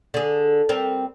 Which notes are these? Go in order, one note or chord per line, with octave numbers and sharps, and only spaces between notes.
D3 G#4
G3 C4 A#4